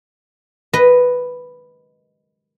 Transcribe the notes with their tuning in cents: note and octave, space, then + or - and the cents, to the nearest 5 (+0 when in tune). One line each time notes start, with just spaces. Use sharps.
B4 +0 D#5 +0